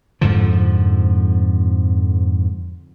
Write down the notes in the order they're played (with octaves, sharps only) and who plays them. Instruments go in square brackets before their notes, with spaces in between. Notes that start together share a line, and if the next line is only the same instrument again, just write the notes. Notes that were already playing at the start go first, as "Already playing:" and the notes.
[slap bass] F2 G#2 D3 F3